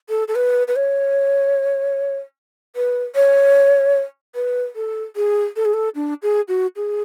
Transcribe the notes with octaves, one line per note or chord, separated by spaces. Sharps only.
A4
A4
B4
B4
C#5
B4
C#5
B4
A4
G#4
A4
G#4
A4
D4
G#4
F#4
G#4